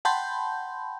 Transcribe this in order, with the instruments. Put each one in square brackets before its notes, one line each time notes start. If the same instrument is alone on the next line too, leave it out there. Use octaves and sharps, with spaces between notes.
[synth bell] F#5 G5 A5 B5 C6 G6